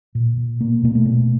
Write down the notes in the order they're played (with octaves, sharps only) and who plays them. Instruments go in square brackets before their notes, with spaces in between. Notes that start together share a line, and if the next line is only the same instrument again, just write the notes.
[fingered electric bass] A#2
A#2
B2 A#3
B2 A#3
A3
B2